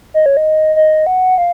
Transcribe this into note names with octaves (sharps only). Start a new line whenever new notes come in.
D#5
C#5
D#5
D#5
F#5
F5